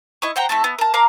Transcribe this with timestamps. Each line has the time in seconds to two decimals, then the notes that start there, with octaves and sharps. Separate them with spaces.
0.22 E4 D#5 C#6
0.36 C5 F#5 G5 A#5
0.49 A3 C4 E4 A4
0.64 B3
0.79 A#4 A5
0.94 A#4 F5 A#5 D6